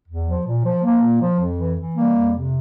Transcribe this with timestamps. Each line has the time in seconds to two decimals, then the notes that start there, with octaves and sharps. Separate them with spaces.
0.09 E2
0.26 F3
0.46 A#2
0.65 F3
0.83 F3 A#3
1.02 A#2
1.21 F3
1.40 F2
1.59 E3
1.78 E3
1.96 G3 A#3
2.15 F2
2.35 C3